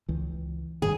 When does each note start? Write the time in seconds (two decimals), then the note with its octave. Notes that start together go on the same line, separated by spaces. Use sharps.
0.08 C#2 E3
0.82 G#1 G2 D#3 G#4